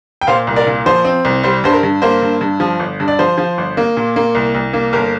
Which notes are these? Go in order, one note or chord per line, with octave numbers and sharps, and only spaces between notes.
G5
A#2 C5 F5
C2
A#4 D5
A#2
F3 C5
C4
C2
G3 C5
G2 C5
A#4
G2
A#3 C5
G2
G2
F3
G1
G2
D5
F3 C5
F3
G1
A#3
A#2
A#3
C2
C2
A#3
G1 A#4